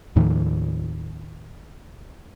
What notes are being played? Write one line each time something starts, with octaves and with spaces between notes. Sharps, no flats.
D#2 A2 D#3 F3